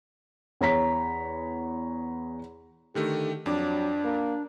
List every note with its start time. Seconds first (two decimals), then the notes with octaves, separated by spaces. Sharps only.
0.61 E2 C#5 A#5 B6
2.95 D3 D#3 A3 G4
3.46 F2 F#3 D4 D6
4.05 A#3